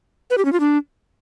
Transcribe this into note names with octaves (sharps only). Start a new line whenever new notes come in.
B4
G4
C#4
F4
D4